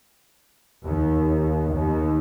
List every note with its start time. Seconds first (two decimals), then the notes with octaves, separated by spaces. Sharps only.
0.85 D#2
1.73 D#2